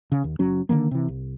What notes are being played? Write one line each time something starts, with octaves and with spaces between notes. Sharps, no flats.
C#3
D#2
F#1 F#3 C#4
D3 D#3 G3 A#3
C3 E3
C2